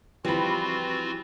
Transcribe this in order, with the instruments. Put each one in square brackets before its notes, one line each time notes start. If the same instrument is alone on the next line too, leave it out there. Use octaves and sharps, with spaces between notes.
[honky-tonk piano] E3 B5 [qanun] F3 G3 [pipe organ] C4 F4 F#4